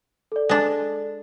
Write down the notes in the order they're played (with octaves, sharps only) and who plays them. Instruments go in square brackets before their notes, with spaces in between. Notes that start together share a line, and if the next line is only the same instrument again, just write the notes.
[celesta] A4 D5
[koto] G#3 D4